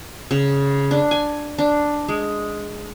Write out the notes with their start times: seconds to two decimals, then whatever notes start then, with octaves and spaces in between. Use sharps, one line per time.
0.31 C#3
0.91 D4
1.11 G#5
1.58 D4
2.08 G#3